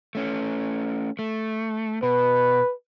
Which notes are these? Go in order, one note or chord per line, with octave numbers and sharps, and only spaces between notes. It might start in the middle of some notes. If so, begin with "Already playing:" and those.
A3 C#4
A3
B2 B4